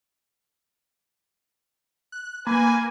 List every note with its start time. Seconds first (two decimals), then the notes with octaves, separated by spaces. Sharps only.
2.12 F#6
2.47 A#3 B4 G#5